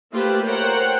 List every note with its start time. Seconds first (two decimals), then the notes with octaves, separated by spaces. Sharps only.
0.12 A3 A#3 F4 G4 B4 C5
0.43 A#4 C5 C#5 F#5 G5 A#5